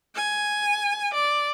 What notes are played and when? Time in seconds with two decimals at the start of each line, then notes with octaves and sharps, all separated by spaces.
0.15 G#5
1.13 D5